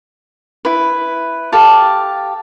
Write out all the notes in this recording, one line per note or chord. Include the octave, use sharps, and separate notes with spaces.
E4 B4
G4 A4 F5 A5